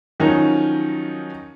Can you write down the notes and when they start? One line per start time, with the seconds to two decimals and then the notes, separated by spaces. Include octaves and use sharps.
0.20 D#3 F3 F#3 C#4 D#4